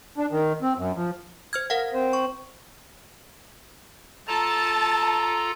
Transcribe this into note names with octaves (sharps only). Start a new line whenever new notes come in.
D4
D#3
C4
F#2
F3
C5 F6 G#6
A#4 F5 F#5
C4 C5
C#6
F4 A4 A5 A#5